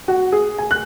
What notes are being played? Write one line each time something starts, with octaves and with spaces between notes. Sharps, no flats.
F#4
G#4
G#5
F#6